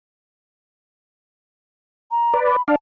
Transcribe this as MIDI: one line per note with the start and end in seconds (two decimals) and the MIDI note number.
2.11 2.39 82
2.34 2.56 71
2.34 2.56 74
2.46 2.62 83
2.68 2.75 62
2.68 2.75 74
2.68 2.75 77
2.68 2.75 81